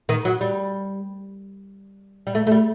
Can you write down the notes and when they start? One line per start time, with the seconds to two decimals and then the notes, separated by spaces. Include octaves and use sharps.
0.09 D#3
0.25 F#3
0.41 G3
2.27 G3
2.35 A3
2.47 A3
2.51 G3